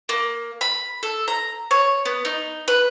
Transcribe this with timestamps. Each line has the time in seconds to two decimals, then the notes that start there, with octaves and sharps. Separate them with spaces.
0.09 A#3
0.61 B5
1.03 A4
1.28 A#5
1.71 C#5
2.05 B3
2.25 D#4
2.68 B4